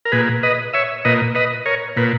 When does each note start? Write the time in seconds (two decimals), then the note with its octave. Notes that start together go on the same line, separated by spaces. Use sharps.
0.05 A#4
0.12 A#2 G#4 B4
0.43 B4 D#5
0.73 C#5 E5
1.05 A#2 B4 D#5
1.35 B4 D#5
1.66 A#4 C#5
1.96 A#2 B4